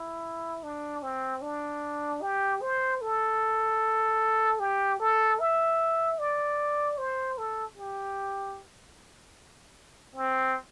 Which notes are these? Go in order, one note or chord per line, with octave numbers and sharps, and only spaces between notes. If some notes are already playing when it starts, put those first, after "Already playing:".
Already playing: E4
D4
C4
D4
G4
C5
A4
G4
A4
E5
D5
C5
A4
G4
C4